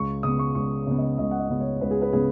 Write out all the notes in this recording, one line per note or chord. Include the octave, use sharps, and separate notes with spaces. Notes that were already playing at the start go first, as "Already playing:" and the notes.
Already playing: C#2 C#6
C#3 B3 D#6
C#6
C#2 C#6
C#3 B3
D#5
C#2 D#5
F#5
D#5
C#3 B3
C#5
C#2 B4
G#4
B4
C#3 B3 G#4